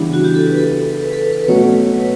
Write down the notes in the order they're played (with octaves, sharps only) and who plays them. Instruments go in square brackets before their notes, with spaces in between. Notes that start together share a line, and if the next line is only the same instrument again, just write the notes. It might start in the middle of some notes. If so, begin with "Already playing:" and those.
Already playing: [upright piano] C#3 E3 G3 B3 E4 [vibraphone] D4
[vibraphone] F#4
G4
A4
B4
A4
B4
A4
B4
B4
[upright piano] B2 F#3 A3 C#4 F#4 [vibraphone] C#5
[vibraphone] B4